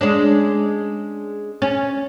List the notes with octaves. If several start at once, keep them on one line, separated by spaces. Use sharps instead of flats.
G#3 C#4 D4
C#4